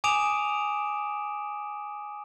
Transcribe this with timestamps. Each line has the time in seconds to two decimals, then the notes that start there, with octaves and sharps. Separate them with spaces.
0.04 G#5 D6 D#6 D7 E7 F7